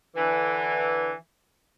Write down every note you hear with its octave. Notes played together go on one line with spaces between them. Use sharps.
D3 E3